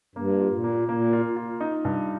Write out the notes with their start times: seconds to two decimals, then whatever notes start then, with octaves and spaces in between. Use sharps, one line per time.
0.15 G2 A#3
0.40 F4
0.52 A#2
0.64 A#3
0.89 A#2 A#3
1.13 F4
1.36 F4
1.60 D#4
1.85 G2